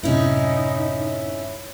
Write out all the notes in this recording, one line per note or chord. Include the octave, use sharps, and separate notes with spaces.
F#2 A2 C3 C#4 D#4 E4